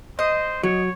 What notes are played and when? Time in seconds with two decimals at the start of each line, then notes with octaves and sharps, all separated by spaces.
0.19 C5 D#5
0.63 F#3 C#5